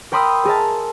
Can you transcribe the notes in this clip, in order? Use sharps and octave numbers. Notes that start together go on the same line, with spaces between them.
A#4 G5 B5 C6 D#6 E6
G#4 A#4 E5 A5